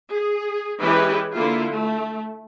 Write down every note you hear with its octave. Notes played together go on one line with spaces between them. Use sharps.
G#4
E3 G#3 C#4 E4 G4 B4
D3 A#3 E4 F4
A3